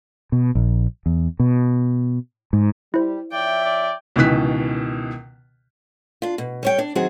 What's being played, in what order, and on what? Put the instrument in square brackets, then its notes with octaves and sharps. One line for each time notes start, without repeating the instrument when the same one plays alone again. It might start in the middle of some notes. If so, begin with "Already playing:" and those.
[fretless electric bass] B2
A#1
E2
B2
G#2
[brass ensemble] G3 [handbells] E4 C5
[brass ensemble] F3 C#5 E5 [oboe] D5 [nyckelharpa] G5
[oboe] D5
[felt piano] C#2 B2 D#3 E3 F#6 B6
[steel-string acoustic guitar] D4 F4
B2
G3 C#5 G5
D4
D#3 F#3 C4 F#4 G#4